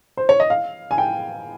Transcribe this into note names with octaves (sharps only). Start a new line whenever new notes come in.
C5
C#5
D#5
F5
G#5
G5